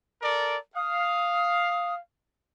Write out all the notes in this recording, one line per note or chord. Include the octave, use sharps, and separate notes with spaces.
A4 A#4 D5
F5 D#6